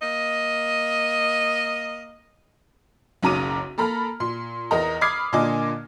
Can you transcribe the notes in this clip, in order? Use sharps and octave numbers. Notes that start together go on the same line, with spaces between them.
A#3 D#5
F#1 B1 C#3 A#5 D6 D#7
A#3 A4 A#5 B5 F6
A#2 C6
E2 A#4 D#5 A#5
B5 D6 D#6 F6 G#6 C7
A#2 D3 A#3 D#5 G#5 D6